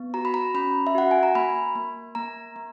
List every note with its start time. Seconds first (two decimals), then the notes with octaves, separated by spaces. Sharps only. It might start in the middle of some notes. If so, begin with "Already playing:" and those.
Already playing: B3
0.14 F#4 A#5
0.25 B5
0.34 A#5
0.54 C#4 B5
0.87 E5
0.95 F#4 F#5
1.11 G#5
1.23 A#5
1.35 A#3 B5
1.75 A#3
2.15 A#3 A#5
2.56 A#3